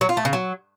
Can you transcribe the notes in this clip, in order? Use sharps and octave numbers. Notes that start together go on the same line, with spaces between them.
F#3
F4
A3
C#3
F#3